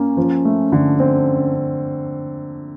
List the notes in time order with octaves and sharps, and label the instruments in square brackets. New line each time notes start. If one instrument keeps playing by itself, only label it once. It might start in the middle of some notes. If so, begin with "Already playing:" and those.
Already playing: [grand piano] A#3 [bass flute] C#4
[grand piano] F3
A3
D3
C4